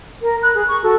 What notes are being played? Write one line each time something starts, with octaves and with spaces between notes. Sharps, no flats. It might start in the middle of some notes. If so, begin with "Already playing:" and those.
A#4
B5 F#6
G#4
C#6
F#4 A4